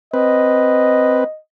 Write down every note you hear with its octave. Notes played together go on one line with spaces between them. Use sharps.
C4 B4 D#5